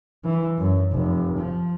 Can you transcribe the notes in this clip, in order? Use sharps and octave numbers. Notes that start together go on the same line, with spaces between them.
E3
F#2
F1
F3